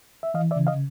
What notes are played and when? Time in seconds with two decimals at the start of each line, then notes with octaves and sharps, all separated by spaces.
0.23 E5
0.34 E3 D#5 F5
0.51 D5 E5
0.56 C#3
0.67 D#5 F5